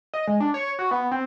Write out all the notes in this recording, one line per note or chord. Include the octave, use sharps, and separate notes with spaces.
D#5
G#3
D4
C#5
F#4
B3
C4